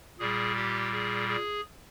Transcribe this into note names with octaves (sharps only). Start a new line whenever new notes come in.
A#2 G3 G#4
G4
G#4
G#4